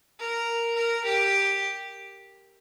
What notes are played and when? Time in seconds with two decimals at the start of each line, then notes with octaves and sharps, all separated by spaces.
0.19 A#4
0.76 A#4
1.05 G4